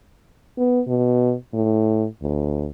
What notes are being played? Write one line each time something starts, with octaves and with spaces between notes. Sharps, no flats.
B3
B2
A2
D2